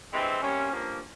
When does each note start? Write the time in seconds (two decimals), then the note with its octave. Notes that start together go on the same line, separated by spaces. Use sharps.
0.12 G2 E3 G#3 C4
0.41 C3 G3 A#3 C#4
0.72 G2 F3 A#3